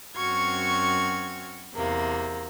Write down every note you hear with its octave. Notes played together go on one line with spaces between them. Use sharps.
F#2 C4 F#4 C#6 F6 G#6
E2 C3 A#3